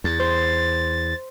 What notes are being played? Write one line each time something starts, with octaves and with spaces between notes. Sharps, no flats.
E2 A6
C5